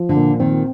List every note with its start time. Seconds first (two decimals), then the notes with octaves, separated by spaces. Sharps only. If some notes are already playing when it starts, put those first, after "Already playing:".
Already playing: F3
0.09 D3
0.17 A#2
0.40 D#3 C4